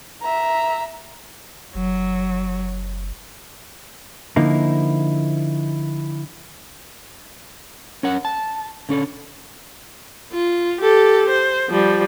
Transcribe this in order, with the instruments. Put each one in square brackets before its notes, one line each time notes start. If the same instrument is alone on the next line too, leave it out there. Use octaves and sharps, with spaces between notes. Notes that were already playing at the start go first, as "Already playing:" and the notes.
[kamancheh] E5 A#5
[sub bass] F#1 [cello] F#3
[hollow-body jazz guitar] D3 F3 A#3 D#4 E4
[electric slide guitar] C#4 A#4 F#5
A5
D3 C#4 A4
[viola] F4
G4 A4
C5
F3 G3